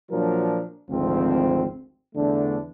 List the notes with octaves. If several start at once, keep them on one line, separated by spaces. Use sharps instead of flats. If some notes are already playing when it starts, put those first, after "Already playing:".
A#2 F3 F#3 D4 A#4
G#1 D2 F3 C4
E2 D3 A3 D4